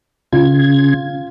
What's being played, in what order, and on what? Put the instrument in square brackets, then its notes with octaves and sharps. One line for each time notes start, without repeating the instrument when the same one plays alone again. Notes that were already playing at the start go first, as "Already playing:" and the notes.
[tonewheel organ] C#3 G#6 [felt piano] F4